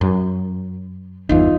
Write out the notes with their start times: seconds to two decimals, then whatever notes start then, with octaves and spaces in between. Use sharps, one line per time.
0.01 F#2
1.29 G1 E2 E3 D#4 F4